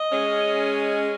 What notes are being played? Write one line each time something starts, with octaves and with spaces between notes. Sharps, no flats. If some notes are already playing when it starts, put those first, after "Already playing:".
Already playing: D#5
G#3 C#4